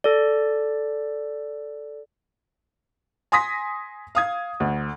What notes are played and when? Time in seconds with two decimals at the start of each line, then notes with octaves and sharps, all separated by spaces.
0.04 A4 D5
3.32 G#5 C6 D#6 A#6 B6
4.15 F5 D#6 G#6
4.60 D2